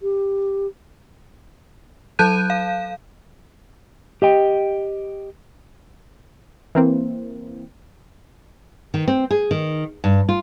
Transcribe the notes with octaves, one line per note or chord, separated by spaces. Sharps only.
G4
F#3 A4 A5 F#6 G6 D#7
F5
G4 D#5 G5
E3 A#3 C4
D#3
C4
G#4
D#3
G2
F4